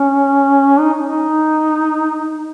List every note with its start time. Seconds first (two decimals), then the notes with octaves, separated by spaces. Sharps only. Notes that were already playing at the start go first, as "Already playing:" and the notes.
Already playing: C#4
0.80 D#4
1.06 D#4